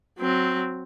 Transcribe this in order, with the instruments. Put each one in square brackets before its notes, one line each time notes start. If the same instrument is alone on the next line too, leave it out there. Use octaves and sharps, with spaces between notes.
[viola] F#3 C4